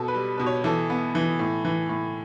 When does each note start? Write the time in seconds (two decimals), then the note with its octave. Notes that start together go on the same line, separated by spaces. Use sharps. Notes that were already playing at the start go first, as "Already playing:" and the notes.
Already playing: B2 A4
0.08 B4
0.14 G3
0.37 B2 B4
0.46 C#5
0.64 E3 A4
0.90 B3
1.15 E3
1.39 A2
1.65 E3
1.89 A2